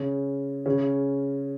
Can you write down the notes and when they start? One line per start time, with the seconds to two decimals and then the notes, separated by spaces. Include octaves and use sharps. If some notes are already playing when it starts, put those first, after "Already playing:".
Already playing: C#3 C#4
0.66 C#3 C#4